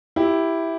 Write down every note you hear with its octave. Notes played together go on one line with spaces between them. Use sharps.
E4 G4